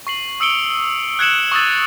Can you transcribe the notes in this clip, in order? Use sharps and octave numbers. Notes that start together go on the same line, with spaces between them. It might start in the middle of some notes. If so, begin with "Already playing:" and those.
C#6 C7 F#7
D#6 E6 C#7 D7 G7
F#6 G#6 C#7 E7 F#7
C#6 D#6 E6 A6